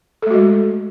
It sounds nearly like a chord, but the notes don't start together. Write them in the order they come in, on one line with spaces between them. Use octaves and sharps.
A4 A3 F#4 G#3